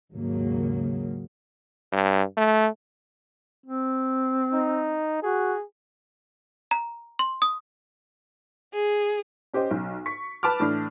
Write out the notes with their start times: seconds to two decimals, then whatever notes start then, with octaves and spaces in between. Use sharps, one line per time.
0.12 G#1 D#2 C#3 F#3 A#3
1.93 G2
2.37 A3
3.66 C4
4.53 D#4
5.23 F#4 G#4
6.71 A#5
7.19 C6
7.42 D#6
8.73 G#4
9.53 C#4 G4 C5 D#5
9.71 B1
10.06 C#6 B6
10.43 B4 A5 B5 D6 F6
10.60 A2 E3 D4